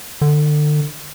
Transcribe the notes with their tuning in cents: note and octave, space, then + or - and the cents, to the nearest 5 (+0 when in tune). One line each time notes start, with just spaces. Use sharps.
D3 +30